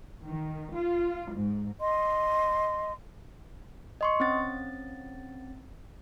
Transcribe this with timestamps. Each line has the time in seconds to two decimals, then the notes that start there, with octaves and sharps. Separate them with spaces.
0.25 D#3
0.74 F4
1.34 G#2
1.80 D#5 C6
4.01 D#5 C6 C#6
4.20 C4 C#4 A6